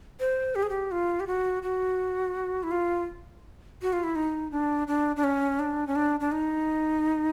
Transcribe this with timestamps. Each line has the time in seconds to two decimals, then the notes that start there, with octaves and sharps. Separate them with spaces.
0.20 C5
0.55 G4
0.63 G#4
0.70 G4
0.91 F4
1.20 G4
1.27 F#4
1.63 F#4
2.63 E4
2.71 F4
3.82 F#4
3.93 F4
4.04 E4
4.15 D#4
4.51 D4
4.88 D4
5.16 D4
5.24 C#4
5.59 D4
5.87 C#4
5.96 D4
6.20 D4
6.32 D#4